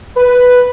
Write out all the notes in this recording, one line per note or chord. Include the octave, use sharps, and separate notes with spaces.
B4